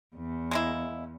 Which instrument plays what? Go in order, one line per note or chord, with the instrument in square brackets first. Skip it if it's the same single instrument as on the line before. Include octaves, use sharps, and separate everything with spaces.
[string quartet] E2
[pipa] G#3 A#3 E4